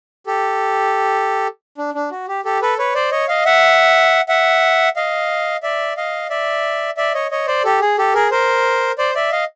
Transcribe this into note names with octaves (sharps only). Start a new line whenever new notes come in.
G4 A4
D4
D4
F#4
G4
G4 A4
A4 B4
B4 C#5
C5 D5
C#5 D#5
D#5 F5
E5 F#5
E5 F#5
D#5 F5
D5 E5
D#5 F5
D5 E5
D5 E5
C#5 D#5
C#5 D#5
C5 D5
G4 A4
G#4
G4 A4
G#4 A#4
A#4 C5
C5 D5
D5 E5
D#5 F5